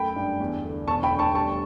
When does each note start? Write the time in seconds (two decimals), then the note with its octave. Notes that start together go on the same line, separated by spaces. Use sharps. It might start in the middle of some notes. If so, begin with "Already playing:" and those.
Already playing: F#2 A3 G5 B5
0.16 G2
0.40 E2
0.64 D3
0.87 E1 A5 C#6
1.03 G5 B5
1.11 D2
1.19 A5 C#6
1.35 G3 A5 C#6